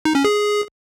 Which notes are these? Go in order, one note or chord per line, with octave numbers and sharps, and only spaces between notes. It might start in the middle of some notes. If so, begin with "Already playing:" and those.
D#4
C#4
G#4